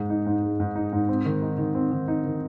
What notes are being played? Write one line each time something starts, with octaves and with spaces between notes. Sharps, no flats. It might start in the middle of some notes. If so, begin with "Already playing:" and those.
Already playing: G#2 G#3
D#4
G#2
G#3
G#2
D#4
G#2
C4
D#3
D#4
D#3
C4
D#3
D#4
D#3